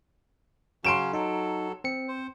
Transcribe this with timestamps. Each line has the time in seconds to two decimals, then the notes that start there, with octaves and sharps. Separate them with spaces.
0.85 C#3 F#3 C#4 C6 D7 E7
1.13 F#3 D#4 A4
1.84 C4 C#7
2.08 C5